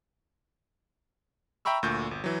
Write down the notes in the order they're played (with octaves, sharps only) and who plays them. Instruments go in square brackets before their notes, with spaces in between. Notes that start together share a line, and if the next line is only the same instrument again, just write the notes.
[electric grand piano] E5 G5 A#5 B5 C#6 E6
D2 A#2 C#6 G6
G1
E3 F#3